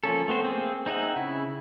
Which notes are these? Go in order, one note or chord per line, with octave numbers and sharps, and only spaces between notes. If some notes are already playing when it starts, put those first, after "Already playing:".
F3 A#3 C#4 A4
A3 B3 C4 C5
A#3 C4 G#4
C4 D#4 G#4 E5 F#5
C#3 E4